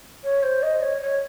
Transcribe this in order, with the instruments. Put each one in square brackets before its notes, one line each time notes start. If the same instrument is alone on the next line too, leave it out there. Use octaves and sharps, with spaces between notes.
[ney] C#5
C5
D#5
C#5
C#5